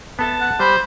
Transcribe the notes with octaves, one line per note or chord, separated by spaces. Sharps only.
B3 A4 E5 A5
F#5
G3 C5 B5